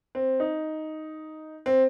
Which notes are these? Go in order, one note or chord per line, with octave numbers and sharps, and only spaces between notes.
C4
D#4
C4